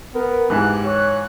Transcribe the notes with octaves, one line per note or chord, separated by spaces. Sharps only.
B3 A#4
G#2 E3 G4 F#6
C#5